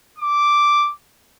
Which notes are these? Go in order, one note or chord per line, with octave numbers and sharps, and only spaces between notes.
D6